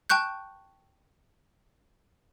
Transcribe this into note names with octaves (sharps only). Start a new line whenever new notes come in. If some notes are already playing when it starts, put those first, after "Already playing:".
G5 A5 C#6 F#6 G6